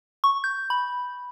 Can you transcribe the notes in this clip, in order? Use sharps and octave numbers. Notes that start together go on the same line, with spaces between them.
C#6
G6
B5